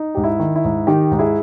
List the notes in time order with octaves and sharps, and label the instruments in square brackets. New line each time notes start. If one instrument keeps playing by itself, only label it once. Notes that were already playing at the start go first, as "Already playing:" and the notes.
Already playing: [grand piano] D#4
G#2 G4
E4
D#3
E4
G#2
D#3 D#4 G4
G#2
E4 G#4